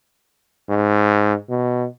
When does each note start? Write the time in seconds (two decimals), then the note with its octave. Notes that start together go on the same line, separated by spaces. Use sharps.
0.69 G#2
1.49 B2